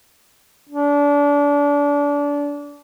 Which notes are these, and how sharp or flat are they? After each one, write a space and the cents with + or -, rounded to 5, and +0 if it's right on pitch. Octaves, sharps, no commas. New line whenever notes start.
D4 -30